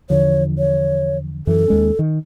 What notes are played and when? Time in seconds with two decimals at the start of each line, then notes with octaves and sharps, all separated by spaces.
0.10 E2 D3 F3 C#5
0.58 C#5
1.47 F#2 E3 A4
1.68 D#2 G#3 C#4
1.99 D#3